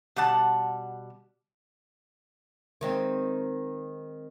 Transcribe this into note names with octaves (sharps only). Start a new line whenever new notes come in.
B2 G3 F#5 A5
D#3 G#3 C4